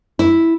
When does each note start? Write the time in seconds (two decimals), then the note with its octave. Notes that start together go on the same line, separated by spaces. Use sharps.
0.19 E4